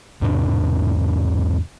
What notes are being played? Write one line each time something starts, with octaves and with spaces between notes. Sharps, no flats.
E2 G#2 C3 D4